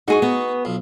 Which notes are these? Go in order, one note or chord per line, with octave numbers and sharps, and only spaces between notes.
G#2 D#4 F#4 G#4 C#6
B3 D#4
B1 F3